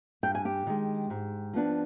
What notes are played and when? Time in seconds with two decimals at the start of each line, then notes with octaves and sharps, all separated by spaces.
0.23 G2 G5
0.35 G#5
0.45 G4 G5
0.67 D#3 G#3
1.10 G#2
1.53 F3 B3 D4